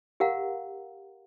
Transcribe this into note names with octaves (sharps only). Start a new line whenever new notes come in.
G4 A#4 F5 F#5 A#5